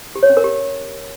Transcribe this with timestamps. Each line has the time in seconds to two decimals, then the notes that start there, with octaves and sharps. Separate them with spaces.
0.16 G4
0.23 C#5
0.30 C#4
0.37 A#4
0.44 G4